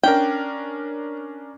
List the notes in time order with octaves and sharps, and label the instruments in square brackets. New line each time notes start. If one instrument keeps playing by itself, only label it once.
[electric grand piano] C#4 D4 A#4 [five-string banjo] G5